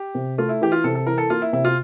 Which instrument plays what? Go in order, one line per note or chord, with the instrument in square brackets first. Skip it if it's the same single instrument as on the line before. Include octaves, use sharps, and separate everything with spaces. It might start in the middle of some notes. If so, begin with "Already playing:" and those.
Already playing: [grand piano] G4
[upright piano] C3
[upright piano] A3 [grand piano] F4
[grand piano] E4
[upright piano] E3 [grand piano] G4
[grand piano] F4
[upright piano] C3 [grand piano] A4
[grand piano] A4
[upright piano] E3 [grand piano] A#4
[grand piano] A4
[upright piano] A#3 [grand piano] F4
[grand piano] E4
[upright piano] C3 [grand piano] E4
[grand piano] F4